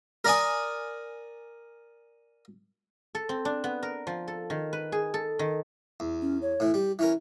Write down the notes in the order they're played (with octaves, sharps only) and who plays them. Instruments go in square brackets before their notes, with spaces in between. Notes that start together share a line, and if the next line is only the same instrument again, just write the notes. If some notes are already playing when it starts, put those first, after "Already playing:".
[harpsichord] A#4 D5 G#5 D#6
[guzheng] A4
C4
D4
B3
A#4
F3
A4
D#3
B4
G#4
A4
D#3
[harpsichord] E2
[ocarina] C#4
C#5
[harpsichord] A2 E3
[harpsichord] G3 [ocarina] G4
[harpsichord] E3 C#4 A#4 [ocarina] E4